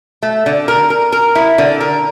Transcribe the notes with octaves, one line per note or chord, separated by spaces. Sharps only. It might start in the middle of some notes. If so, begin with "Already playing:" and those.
A3
D3
A#4
A#4
A#4
E4
D3
A#4